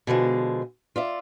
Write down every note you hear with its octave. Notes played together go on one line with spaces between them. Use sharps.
B2 D3 F3 G#3
F4 D5 E5